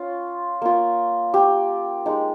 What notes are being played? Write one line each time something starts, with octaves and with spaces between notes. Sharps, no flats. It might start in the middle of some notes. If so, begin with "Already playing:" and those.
Already playing: C#4 F4
A#3 F4
G4
G#3 D#4